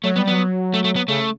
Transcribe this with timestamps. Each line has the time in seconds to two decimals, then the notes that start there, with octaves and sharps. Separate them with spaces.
0.04 F#3 A3
0.16 G3 B3
0.27 F#3 B3
0.74 A3
0.84 A3
0.96 B3
1.08 C#3 A3